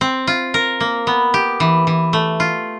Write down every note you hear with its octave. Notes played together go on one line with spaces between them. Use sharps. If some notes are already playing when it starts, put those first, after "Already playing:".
C4
F4
A#4
A#3
B3
G4
E3
E3
A3
F4